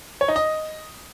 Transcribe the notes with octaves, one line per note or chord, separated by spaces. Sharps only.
C#5
D#4
D#5